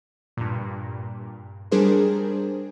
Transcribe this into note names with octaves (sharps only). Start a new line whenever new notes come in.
G2 A#2
G3 D4 G#4 A#4 C5